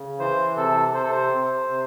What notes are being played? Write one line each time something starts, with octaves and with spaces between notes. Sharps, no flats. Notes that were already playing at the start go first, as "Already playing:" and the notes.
Already playing: C#3
E3 C5
C3 A4
C3 C5
A4
C5
C3
C3